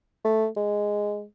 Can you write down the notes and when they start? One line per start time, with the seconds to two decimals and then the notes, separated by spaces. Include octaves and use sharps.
0.24 A3
0.56 G#3